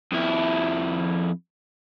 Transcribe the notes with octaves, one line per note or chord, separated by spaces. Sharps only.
F2 E4